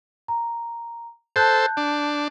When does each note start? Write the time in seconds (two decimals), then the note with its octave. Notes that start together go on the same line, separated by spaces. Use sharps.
0.28 A#5
1.36 A4 C5 A5 F#6 G6
1.77 D4